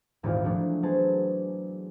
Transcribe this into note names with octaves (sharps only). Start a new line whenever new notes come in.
D#1 G#1 D#2 A#2 E3 F4
F3 F#3 A3 D4 E4
F#3 B3 G#4 C5 A5